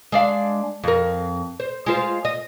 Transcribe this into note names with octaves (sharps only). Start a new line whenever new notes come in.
G#3 D4 F5
F2 A#4
C5
G#3 F4 C5
D#5